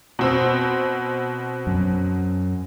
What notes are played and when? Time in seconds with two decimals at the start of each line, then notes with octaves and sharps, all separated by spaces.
0.19 B2 C4 E6
1.67 F#2